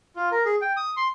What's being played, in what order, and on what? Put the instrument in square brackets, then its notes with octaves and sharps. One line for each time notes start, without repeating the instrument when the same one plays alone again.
[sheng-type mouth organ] F4
A#4
G#4
G5
D#6
C6